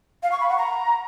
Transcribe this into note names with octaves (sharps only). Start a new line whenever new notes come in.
F5
C#6
B5
F#5
A#5